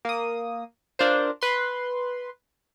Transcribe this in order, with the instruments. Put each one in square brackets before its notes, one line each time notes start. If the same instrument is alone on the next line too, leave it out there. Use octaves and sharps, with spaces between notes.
[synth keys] A#3 D#6
D4 F4 A#4 C5
B4 C6